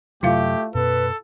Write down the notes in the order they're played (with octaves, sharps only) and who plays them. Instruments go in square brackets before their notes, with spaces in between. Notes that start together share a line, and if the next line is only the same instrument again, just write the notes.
[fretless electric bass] F#2 C3 F#3 [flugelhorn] A3 [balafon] E4 F4 F5 [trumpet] G4
[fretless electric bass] F#2 B2 B3 [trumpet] A4 [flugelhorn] B4